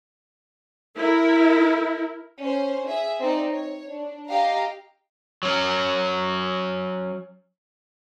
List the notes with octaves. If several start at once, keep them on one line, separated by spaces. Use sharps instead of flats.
E4 A#4
C#4 C5
G#4 E5
C4 D#4 D5
C#5
D4
G4 D#5 F5 A#5
F#3 C#4